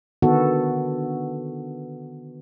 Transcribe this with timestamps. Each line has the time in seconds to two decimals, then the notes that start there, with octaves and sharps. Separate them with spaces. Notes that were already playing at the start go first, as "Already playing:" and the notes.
0.22 D3 D#3 B3 F#4 A4